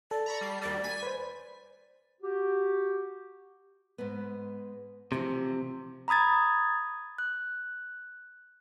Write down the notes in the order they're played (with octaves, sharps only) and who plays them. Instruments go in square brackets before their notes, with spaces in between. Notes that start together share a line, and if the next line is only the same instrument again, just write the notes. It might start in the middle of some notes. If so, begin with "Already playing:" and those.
[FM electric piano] A4 [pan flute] D5
[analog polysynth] A#5 B5 C#6
G3 C7
[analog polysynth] D#2 G3 [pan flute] D5
[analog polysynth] G#5 B6
[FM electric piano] B4 C5
[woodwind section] F#4 G4
[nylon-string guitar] G#2 G#3 B3
[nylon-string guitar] D2 E3 F3 [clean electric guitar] C3
[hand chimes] A#5 B5 D#6 G#6 A6
F#6